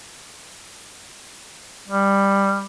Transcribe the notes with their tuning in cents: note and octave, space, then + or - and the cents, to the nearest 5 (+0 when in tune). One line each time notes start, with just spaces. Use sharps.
G3 +10